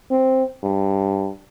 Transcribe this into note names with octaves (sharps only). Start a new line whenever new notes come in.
C4
G2